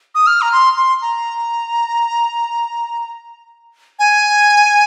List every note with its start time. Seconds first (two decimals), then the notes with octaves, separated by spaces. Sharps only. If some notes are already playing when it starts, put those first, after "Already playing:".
0.15 D#6
0.27 F6
0.42 A#5
0.52 C6
0.77 C6
1.02 A#5
3.99 G#5